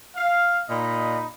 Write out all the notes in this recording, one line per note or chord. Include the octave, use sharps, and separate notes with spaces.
F5
A#2 D#4 D#5 B5